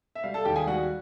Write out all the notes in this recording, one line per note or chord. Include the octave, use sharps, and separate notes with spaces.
E5
G3 F5
A4 A5
D#2 G4 G5
G#4 G#5
G3 F#4 F#5